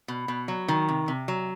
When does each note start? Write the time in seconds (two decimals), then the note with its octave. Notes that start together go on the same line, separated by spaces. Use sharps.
0.08 B2
0.28 B2
0.48 F#3
0.68 D#3
0.88 C3
1.08 C3
1.28 F#3